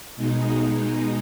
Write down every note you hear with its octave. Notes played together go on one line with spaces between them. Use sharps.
B2 G#3 D#4